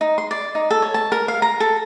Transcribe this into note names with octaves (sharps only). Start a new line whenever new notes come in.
D#4
C6
D5
D#4
A4
C#5
A5
A#4
F5
A#5
A4